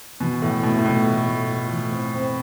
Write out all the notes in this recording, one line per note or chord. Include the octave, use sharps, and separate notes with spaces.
B2 E3
A2 E3
B2 A3
A2
B2 F4
A3
A3
F4
E3
C4
C4